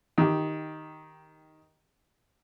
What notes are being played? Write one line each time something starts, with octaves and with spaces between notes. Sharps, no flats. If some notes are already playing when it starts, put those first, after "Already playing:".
D#3 G4